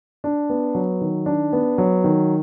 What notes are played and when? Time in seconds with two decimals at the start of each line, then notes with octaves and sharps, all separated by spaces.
0.24 D4
0.50 B3
0.75 F#3
1.01 D#3
1.26 D4
1.53 B3
1.78 F#3
2.04 D#3